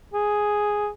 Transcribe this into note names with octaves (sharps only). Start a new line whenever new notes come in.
G#4